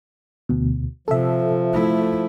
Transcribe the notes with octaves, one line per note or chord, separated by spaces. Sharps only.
D2 B2
C3 F3 A4 E5
A3 E4